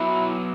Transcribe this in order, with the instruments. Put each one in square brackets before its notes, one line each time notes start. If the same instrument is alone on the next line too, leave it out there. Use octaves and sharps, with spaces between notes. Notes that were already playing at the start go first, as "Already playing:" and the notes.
Already playing: [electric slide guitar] F#3 B3 F#4 [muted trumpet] E4